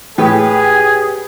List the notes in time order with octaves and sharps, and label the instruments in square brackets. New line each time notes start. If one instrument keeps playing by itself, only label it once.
[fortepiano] A2 [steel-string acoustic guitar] G4 B4 [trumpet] G#4